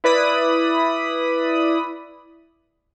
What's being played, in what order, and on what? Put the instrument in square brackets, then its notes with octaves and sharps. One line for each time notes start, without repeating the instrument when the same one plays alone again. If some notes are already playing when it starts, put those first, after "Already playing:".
[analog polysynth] E4 B4 D5 B5 D#6